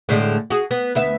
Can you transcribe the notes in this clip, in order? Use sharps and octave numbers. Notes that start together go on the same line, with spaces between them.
A2 D3 G#3
F#4 G#4
B3
D2 B3 E5